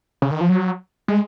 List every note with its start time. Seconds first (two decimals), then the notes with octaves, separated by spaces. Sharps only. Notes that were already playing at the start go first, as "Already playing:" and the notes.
0.22 C#3
0.31 D#3
0.41 F3
0.49 F#3
1.08 G#3